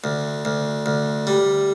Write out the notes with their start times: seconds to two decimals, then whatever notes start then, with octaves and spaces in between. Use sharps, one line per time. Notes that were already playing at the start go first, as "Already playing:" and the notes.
0.04 D2
0.45 D2
0.86 D2
1.27 G3